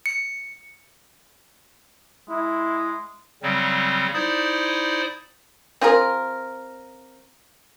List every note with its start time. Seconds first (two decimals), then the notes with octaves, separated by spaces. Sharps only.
0.06 C#7
2.30 G#3 E4
3.43 C#3 F#3 G3 C4
4.14 D#4 E4 C5 D5 D#6
5.81 C4 F4 G#4 A#4